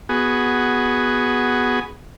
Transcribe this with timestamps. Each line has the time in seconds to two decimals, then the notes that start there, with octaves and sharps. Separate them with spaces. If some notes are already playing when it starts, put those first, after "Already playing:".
0.09 B3 F#4 G#4